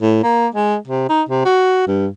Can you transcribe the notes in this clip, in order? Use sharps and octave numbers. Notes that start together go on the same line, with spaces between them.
A2
A#3
G#3
C3
D#4
C3
F#4
G2